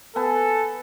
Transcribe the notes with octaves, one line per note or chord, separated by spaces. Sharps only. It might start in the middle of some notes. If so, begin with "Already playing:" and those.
B3 A4 G#5 A5